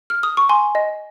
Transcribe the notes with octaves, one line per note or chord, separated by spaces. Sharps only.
F6
D#6
C#6
G#5 C6
D#5